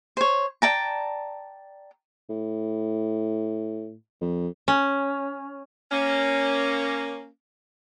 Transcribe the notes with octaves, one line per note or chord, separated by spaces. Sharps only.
C5 C#5
D5 G5 A5 A#5
A2
F2
C#4
A#3 C#4